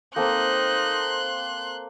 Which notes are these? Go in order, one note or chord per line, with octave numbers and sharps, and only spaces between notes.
A#3 C4 D#4 A4 C6 F#6